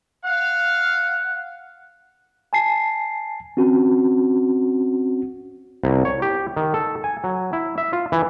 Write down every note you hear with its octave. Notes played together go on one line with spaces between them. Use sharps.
F5 F#5
G#5 A5 C7
C4 C#4 F#4
C2
C#5
G4
D#3
A4
G#5
F#3
E4
E5
F4
E3